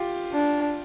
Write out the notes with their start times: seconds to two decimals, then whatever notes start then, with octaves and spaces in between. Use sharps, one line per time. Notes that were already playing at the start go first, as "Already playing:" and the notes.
Already playing: F4 G4
0.32 D4